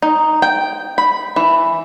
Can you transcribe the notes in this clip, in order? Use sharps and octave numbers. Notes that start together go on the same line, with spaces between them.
D#4
G5
B5
E3